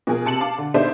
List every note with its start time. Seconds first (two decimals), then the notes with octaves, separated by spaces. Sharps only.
0.07 B2 F3 G#4 A#4
0.25 C3 A5 C#7 F#7
0.40 F5 A5 D6
0.58 D3
0.74 B3 D4 D#4 A4 C5 E5